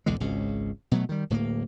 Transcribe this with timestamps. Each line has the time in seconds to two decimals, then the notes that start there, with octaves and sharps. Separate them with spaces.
0.06 B1 E2 D3 G#3
0.20 G#1 C#2 C#3
0.91 B2 F#3 A3
1.09 D#3 G3
1.30 D1 A2 A3 A#3